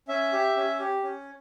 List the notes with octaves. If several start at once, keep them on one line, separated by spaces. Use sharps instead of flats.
C#4 E5
G4
C#4
G4
C#4